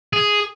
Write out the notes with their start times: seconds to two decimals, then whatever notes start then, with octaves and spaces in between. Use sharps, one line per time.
0.13 G#4